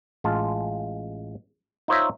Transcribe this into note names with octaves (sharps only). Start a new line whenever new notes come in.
A1 G#3 F4 A5
D#4 F4 C5 C#5 D#5 E5